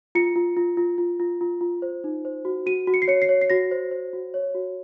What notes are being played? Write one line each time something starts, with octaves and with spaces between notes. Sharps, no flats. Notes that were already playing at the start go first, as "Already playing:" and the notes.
F4 C#7
F4
F4
F4
F4
F4
F4
F4
C5
D#4
C5
F#4
F#4 D#7
F#4
C#7
C7
C#5 C#7
C7
C#5
C7
F#4 A#6
C5
C5
F#4
C#5
F#4